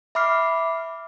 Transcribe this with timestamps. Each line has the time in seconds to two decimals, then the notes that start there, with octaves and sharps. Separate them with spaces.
0.15 E5 B5 D6 F6 C7